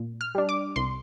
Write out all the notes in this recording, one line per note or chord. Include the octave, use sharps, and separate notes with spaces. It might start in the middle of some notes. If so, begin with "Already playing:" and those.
Already playing: A#2
F6
G3 D4
D6
C2 C6